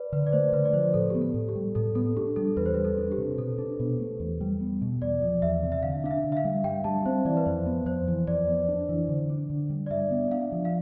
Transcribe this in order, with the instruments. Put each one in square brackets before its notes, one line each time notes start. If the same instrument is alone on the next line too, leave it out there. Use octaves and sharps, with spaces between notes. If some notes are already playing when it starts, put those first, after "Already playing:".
Already playing: [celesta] B4 D5
[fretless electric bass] D3 [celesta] B4
[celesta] D5
[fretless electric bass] A3 [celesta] C5
[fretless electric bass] D3 [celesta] B4
[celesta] D5
[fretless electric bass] F3 [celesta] C5
[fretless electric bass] A2 [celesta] A4
[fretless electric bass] B3 [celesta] G4
[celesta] A4
[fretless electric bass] A2
[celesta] G4
[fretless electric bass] G3
[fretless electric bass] A2 [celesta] A4
[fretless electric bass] B3 [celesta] A4
[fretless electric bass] D4 [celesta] G4
[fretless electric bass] G3 [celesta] A4
[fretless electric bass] E2 [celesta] B4
[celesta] C5
B4
[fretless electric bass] G3
[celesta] A4
[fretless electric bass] D4
[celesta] G4
[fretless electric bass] C3
[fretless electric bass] B2 [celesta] A4
[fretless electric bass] D4
B2
A3
E2
G3
B3
B2
[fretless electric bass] E2 [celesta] D5
[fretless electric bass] F3
[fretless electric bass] E2 [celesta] E5
[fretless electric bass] C3
[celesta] E5
[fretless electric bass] D3 [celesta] F5
[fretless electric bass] D4 [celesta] F5
[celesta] E5
[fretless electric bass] D3
[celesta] E5
F5
[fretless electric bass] G3
[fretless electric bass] G2 [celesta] G5
[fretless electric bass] G3 [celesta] A5
[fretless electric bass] C4 [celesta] C5
[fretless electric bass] E3 [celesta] D5
[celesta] B4
[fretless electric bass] F2 [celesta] C5
[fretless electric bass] B3
[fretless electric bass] F2 [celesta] C5
[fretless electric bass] E3
[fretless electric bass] F2 [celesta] D5
[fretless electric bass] B3
D4
E3
D3
D4
D3
G3
[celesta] D5
[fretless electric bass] G2 [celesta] E5
[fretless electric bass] B3
[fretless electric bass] D4 [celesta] F5
[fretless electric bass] F3
[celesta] F5